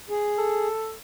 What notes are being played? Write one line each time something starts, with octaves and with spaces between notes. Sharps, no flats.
G#4
A4